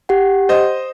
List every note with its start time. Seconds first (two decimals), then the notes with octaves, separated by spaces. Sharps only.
0.09 G4 F#5
0.49 C5 D#5